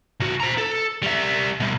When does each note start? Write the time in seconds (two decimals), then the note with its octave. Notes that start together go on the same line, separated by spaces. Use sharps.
0.20 C2 F#4
0.40 C5 A#5
0.58 A4
1.03 G3 E5
1.60 B2 G3